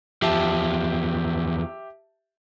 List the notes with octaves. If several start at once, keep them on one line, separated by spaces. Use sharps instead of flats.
E2 F3 G4 E5 A5